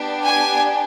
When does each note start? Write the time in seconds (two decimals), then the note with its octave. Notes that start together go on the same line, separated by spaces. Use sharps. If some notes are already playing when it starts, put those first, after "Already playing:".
Already playing: B3 D4 G4
0.23 G#5